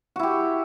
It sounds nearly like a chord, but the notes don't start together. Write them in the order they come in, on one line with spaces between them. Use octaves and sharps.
F#4 E4 G4